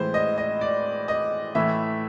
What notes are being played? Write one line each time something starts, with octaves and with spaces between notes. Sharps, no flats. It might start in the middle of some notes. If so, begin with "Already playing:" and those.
Already playing: A2 E3 G#3 C5
D#5
D#5
D5
D#5
A2 E3 A3 E5